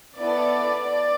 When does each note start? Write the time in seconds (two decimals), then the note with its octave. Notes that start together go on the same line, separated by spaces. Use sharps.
0.19 B3 E4 A4 D5
0.83 D5